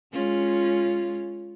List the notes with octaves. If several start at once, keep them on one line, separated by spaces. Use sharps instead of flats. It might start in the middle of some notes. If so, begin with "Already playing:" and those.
G#3 C#4 F4